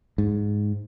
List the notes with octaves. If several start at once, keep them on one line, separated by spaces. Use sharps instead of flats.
G#2